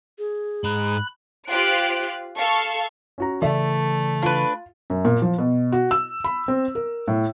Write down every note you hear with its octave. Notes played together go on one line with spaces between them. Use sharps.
G#4
G#2 A#5 B5 F#6
F4 G4 C5 F5 F#6 D7
A4 F5 C#6
C#4 F#4 A#5
C#3 E3 A3 A4 D5 E5
D4 F4 B4
F#2
A#2
F3
B2
F#4
E6
B5
C4
A#4
A2